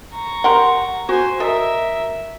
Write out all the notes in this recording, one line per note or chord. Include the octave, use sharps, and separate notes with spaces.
A#5 C#6
G4 A#4 F#5 C6
F#4 C5 G#5
A4 A#4 D#5 E5